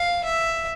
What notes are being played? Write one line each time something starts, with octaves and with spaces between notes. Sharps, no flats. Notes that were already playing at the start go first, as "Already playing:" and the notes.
Already playing: F5
E5